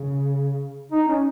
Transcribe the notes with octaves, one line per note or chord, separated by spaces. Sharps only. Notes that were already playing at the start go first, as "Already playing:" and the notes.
Already playing: C#3
D#4
C#4